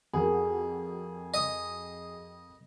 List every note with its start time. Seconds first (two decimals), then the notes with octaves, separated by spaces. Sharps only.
0.14 F2 F#4 G#4 A#4
1.34 D#5